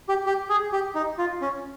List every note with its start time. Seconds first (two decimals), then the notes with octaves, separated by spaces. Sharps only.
0.09 G4
0.26 G4
0.49 G#4
0.73 G4
0.95 D#4
1.18 F4
1.42 C#4